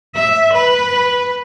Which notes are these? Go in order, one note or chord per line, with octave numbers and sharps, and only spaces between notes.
E5
B4